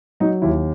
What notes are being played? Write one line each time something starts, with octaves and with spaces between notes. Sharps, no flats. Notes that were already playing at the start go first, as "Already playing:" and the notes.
F#3 D#4
D#2 E4